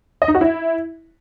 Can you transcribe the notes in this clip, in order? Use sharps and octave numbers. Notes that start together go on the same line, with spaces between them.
D#5
D#4
F#4
E4